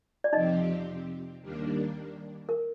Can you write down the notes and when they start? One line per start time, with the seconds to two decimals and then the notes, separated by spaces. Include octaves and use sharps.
0.24 D5
0.33 F2 C3 F3 C4 D#4 G4 D#5
1.41 D#2 D#3 G3 A#3 D4
2.49 A#4